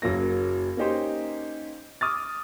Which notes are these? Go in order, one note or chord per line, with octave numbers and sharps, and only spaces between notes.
F#1 F#3 A#3 A#6
A#3 C#4 D#4 G4 C5
D6 D#6 F6 A6